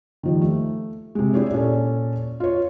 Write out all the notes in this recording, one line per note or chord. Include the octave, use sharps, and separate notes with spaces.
D#3 F3 G3
A3
C3 G#3
D4 E4 G4 G#4 C#5
A#2 C#4 A4
F4 C#5